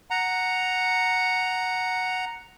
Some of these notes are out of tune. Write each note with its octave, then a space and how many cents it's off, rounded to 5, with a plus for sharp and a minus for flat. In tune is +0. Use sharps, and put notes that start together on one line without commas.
F#5 +0 A#5 +0